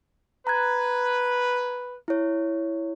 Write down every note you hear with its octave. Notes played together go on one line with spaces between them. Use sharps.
B4 A#5 F#6 G#6
E4 C#5